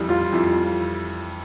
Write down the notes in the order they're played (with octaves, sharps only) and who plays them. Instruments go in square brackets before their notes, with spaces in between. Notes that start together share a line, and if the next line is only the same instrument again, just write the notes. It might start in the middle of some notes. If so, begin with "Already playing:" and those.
Already playing: [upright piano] F2 E3 G3
[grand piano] F4
[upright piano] F2 E3 G3